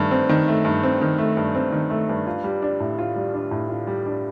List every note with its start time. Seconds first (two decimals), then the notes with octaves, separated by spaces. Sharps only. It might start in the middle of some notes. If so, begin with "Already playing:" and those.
Already playing: G2 D#3 A3
0.11 C4
0.29 D#3
0.48 A3
0.65 G2
0.83 C4
1.01 D#3
1.18 A3
1.37 G2
1.55 C4
1.72 D#3
1.90 A3
2.09 G2
2.27 F4
2.44 G3
2.62 D4
2.80 A2
2.99 F4
3.16 G3
3.34 D4
3.51 A2
3.69 F4
3.87 G3
4.06 D4